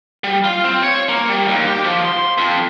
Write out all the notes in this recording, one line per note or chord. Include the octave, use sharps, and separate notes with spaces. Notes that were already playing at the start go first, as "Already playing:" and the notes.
G3
F4
C4
C#5
A#3
G3
D#2
G4
F3
C6
F2